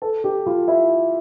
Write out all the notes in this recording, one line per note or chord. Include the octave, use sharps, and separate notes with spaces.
A4
G4
F4
E4